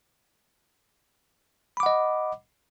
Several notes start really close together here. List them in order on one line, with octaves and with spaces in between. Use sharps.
B5 D6 F#5 D#5